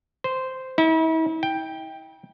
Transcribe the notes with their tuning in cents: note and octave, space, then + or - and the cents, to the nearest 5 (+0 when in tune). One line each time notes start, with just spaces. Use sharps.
C5 -10
E4 -40
G5 +10